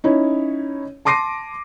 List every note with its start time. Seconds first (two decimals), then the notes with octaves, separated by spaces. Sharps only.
0.04 C#4 D#4 E4 C#5
1.05 A5 C6 D6 A#6 C7 D#7